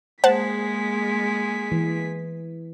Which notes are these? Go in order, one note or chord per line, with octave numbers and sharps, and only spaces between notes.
G#3 A#3 G#4 C5 F#5 A5 B6
E3